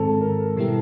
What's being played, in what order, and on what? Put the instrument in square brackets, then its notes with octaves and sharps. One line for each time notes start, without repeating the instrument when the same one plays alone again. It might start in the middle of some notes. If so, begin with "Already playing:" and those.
Already playing: [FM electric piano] G#2 D#3 G#3 C4 [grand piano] A4
[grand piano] A#4
[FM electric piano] B2 G3 B3 E4 G4